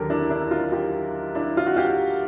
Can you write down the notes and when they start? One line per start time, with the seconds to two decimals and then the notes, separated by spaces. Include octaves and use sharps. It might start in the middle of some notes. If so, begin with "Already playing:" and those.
Already playing: D#2 D3 F#3 G4 A4 A#4
0.10 D4 E4
0.30 D4 E4
0.51 D#4 F4
0.72 F4 G4
1.35 D4 E4
1.57 F4
1.66 F#4
1.76 F4 G4